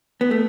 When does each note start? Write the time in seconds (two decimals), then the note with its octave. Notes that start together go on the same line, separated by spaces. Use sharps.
0.21 B3
0.31 A3